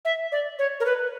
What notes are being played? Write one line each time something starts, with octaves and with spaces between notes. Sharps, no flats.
E5
D5
C#5
A#4
B4